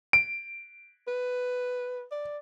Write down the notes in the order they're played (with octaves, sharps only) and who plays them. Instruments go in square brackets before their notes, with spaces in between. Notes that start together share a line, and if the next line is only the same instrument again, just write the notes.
[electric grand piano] D7
[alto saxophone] B4
D5